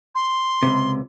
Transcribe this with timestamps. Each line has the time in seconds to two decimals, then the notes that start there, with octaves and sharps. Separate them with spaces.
0.15 C6
0.63 C#2 G#2 C3